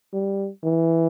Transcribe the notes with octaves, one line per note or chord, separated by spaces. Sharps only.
G3
E3